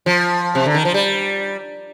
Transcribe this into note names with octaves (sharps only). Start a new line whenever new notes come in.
F3
C3
D3
D#3
F3
G3